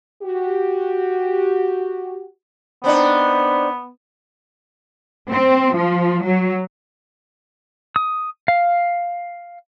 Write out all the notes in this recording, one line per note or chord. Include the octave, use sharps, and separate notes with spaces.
F#4 G4
B3 C4 D4 D#4
C4
F3
F#3
D#6
F5